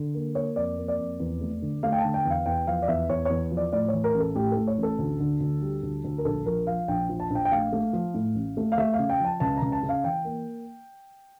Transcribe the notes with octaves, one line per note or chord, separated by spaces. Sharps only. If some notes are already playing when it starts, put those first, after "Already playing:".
Already playing: D3
A#3
A#3 C#5
F2 D5
A#3
D5
F2
E2
A3
D3
A3 F5
G5
A5
D3
G5
E2
F5
E2 G5
F3 F5
D5
E2 E5
E2 C#5
C#5
E2
F3
D5
A2 D5
E3 C#5
A#4
A1
A4
A2 G4
A2 A4
C#5
A1
A4
D2
D3
D2
G3
D2
D2
A#4
A#1 A4
F3 A#4
F3 F5
A#1 G5
F3
A5
A#1
G5
G5
A3 F5
A3
F3
A2
A1
A3
F5
A3 E5
F5
C#3
G5
F3 A5
C#2 A5
A#5
C#2
A5
C#3
F5
E3 G5
A#3